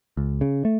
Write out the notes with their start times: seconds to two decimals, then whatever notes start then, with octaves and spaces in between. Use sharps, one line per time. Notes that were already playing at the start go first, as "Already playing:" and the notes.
0.17 C#2
0.41 C#3
0.65 A3